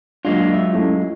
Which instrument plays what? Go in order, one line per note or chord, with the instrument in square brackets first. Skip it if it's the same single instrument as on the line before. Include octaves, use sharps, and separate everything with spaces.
[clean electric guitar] F#3 G#3 F4 [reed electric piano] A#3 D4
[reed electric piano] E5
A3 C#4 E4